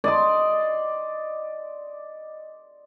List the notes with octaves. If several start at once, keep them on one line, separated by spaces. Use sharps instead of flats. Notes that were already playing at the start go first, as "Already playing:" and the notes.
D5 D#5 C6